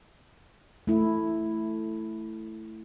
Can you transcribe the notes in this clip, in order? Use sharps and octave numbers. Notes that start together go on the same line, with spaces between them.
A3 E4